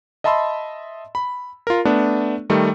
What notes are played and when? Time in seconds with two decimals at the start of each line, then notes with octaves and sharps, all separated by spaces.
0.24 D#5 E5 A5 B5 C6 E6
1.15 B5
1.67 F4 A#4
1.85 A3 B3 D4
2.50 D#3 G3 A3